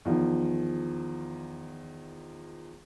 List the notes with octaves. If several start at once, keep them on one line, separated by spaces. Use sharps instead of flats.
E2 D#3 F3